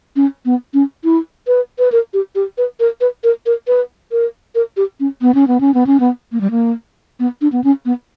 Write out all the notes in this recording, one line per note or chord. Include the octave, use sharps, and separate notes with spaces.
C#4
B3
C#4
E4
B4
B4
A#4
G4
G4
B4
A#4
B4
A#4
A#4
B4
A#4
A#4
G4
C#4
B3
C#4
B3
C#4
B3
C#4
B3
A#3
G3
A#3
B3
D4
B3
C#4
B3